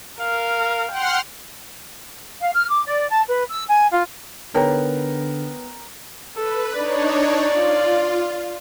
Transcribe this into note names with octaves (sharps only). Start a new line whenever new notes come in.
A#4 F5
F#5 G5 C6 F6
F5
F6
D6
D5
A5
B4
E6
G#5
F4
D3 B3 D#4 G#4 A#4 C#5 G5 A#5
A4 B4
D4 D#4 C#5 D5
F4